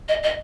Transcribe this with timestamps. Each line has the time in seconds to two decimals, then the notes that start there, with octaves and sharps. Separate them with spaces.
0.08 D#5
0.23 D#5